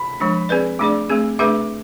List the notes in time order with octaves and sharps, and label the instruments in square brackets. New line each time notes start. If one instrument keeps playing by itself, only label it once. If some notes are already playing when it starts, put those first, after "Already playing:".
Already playing: [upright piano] B5
[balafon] F3 G#3 D4
C4 G#4 B4 D5
[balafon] A3 D4 G#4 D5 [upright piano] D6
[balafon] A3 C4 G#4
[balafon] A3 D4 G#4 B4 E5 [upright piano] D6